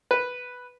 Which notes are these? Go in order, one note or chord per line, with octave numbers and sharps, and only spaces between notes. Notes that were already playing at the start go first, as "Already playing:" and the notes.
B4